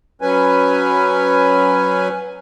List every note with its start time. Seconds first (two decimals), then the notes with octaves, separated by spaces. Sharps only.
0.22 F#3 C#4 B4 G#5